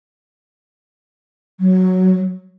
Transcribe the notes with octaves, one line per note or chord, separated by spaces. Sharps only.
F#3